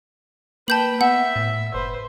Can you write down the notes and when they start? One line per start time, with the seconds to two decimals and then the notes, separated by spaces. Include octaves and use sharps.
0.68 A#3 B4 G5 A5 G6 F#7
1.01 B3 E5 F#5
1.36 A2
1.74 F#1 B4 C5